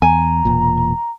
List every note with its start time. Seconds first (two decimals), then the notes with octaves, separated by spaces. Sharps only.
0.02 E2 G#5 A#5
0.45 E1 A#2